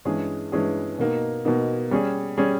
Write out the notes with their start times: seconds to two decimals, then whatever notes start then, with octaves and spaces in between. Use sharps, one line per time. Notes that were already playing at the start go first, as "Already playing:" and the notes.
0.05 G2 E3 G#3 C#4 G#4
0.52 G2 E3 G#3 C#4 G#4
0.99 B2 A#3 D#4
1.45 B2 A#3 D#4
1.91 G3 C#4 G#4
2.38 G3 C#4 G#4